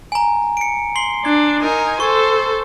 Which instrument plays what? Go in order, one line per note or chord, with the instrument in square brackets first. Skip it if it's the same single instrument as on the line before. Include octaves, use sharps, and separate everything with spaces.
[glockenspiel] G#5 A#5
C#7 D7
C6 C7 G7
[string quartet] D4 [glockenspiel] G#6
[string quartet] D#4 A#4 G#5
[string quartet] A4 C5 [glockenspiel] C#6